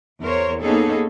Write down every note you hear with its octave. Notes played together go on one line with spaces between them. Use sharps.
E2 A#4 C5 C#5
A#3 B3 C#4 D#4 G#4 A4